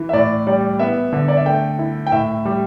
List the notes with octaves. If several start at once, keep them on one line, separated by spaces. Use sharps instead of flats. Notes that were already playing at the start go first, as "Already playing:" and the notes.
Already playing: E3
E5
A2 D5
G3 D5
B3 E5
D3
D5
E5
A3 G5
E4
G5
A2 E5
G3